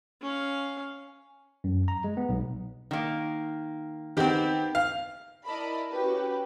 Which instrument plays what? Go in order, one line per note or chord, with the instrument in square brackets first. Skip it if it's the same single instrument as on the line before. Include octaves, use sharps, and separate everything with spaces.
[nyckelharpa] C#4 F5
[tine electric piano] F#2
A#5
G#3
B3
B1
[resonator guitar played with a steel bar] D#3 A#3
[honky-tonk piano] D#3 G4 [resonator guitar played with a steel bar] B3 C4
[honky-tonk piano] F5
[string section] E4 A#4 D5 D#5 A5 B5
C#4 F#4 G4 B4